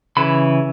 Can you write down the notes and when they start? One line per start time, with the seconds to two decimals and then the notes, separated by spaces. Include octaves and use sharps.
0.17 C#3 E3 B5